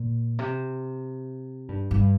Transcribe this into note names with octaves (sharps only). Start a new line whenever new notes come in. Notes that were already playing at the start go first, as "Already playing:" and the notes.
Already playing: A#2
C3
G2
G2